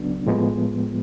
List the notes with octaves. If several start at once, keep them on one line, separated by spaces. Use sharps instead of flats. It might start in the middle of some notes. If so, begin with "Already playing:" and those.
Already playing: C#2 C#3 F#3 B3 D4
A2 F3 G#3 B3